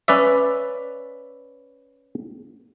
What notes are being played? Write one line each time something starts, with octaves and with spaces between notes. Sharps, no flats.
C#4 B4 D5 E5